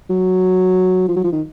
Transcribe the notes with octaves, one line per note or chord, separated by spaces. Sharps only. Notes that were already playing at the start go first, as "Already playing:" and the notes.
F#3
F3
F#3
F3
D#3